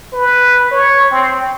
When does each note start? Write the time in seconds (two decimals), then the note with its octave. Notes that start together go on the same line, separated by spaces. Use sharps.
0.13 B4
0.71 C#5
1.11 C4